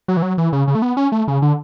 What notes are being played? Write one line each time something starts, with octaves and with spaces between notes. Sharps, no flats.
F#3
E3
F#3
E3
C#3
C#3
A3
B3
C#4
A3
C#3
D3